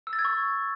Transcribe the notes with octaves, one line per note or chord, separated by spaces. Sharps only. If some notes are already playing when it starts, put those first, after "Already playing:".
E6
A6
G#6
C#6